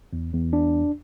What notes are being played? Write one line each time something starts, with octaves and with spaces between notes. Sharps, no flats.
E2
E2
D4